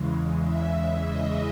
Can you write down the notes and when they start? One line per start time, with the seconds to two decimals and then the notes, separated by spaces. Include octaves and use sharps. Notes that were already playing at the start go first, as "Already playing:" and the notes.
Already playing: E2 C#3 E3 G#3
0.41 E5
1.06 D#5